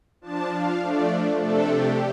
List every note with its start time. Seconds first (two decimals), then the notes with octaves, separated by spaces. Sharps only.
0.21 F3 D4 A5
0.52 F5
0.81 F3 A3 D4 D5
1.41 C3 A3 D4 A4
1.71 G4